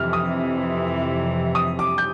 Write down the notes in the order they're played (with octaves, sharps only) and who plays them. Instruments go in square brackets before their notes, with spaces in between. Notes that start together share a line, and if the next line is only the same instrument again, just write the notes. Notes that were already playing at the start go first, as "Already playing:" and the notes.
Already playing: [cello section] F2 C3 E3 [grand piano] F6
[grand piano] D#6
D#6
D6
G6